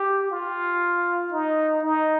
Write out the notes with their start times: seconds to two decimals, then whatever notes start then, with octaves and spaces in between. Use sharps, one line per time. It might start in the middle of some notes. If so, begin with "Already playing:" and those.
Already playing: G4
0.31 F4
1.32 D#4
1.83 D#4